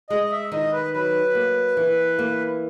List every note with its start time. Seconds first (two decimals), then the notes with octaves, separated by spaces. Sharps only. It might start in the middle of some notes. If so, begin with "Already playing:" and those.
0.10 G#3 D#5
0.23 D#5
0.31 E5
0.52 D#3 D#5
0.72 B4
0.93 F#3 B4
1.35 A#3
1.77 E3
2.19 A#3